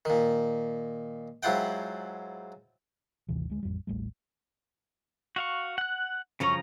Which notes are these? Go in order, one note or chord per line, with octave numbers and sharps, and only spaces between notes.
A#2 D#3
G#2 F#3 E4 F4 F#5 G5
A1 D#2 C3 E3
D2 G#3
A1 F2 G3
D#1 A1 G3 A3
F#4 F5 C#6
F#5 F#6
F#2 C#3 F3 C#4 C#5 A#5